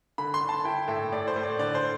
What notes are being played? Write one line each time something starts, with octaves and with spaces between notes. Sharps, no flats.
D3 B5
C6
D3
A5
E4 G5
A2 E5
A2 D5
C5
A2
D5
D3 D5
C5